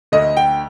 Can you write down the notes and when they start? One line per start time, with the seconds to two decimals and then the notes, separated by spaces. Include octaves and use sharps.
0.12 D2 D3 A3 D#5
0.37 G5